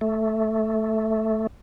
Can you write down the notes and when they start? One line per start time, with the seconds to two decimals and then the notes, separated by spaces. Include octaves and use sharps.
0.01 A3